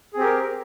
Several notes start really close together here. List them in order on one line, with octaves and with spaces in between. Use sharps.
G#4 C4 G4 A#4